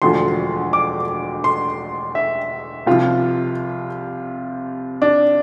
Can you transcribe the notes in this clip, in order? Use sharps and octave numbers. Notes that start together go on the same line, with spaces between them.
E1 D2 D3 F3 C6
D6
C6
E5
C2 C3 F3 F4
D4